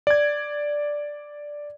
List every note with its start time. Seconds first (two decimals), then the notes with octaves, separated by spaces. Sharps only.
0.07 D5 G#6